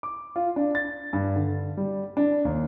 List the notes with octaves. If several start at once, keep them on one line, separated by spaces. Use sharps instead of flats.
D6
F4
D4
A6
G2
D3
G3
D4
D#2